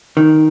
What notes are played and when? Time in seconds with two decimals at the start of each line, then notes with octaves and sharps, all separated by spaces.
0.17 D#3